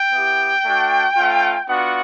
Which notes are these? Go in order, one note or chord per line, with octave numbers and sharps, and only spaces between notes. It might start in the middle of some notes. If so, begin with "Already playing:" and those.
Already playing: G5
B3 E4 G4
A3 D4 F#4
A3 C#4 F4
B3 D4 F4 F#4 F#5